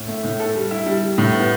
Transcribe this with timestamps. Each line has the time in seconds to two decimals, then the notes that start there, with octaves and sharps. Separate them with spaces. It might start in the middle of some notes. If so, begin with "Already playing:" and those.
Already playing: A2
0.08 A3
0.24 A2
0.40 A4
0.55 G3
0.71 E4
0.86 G3
1.02 G3
1.18 A2
1.34 B3